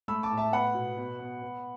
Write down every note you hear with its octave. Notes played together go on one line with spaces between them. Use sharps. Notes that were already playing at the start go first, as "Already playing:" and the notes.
A3 B5 E6
A5 D6
A2
E5 A5
B3 F#5 B5
B2
B2
B3
B3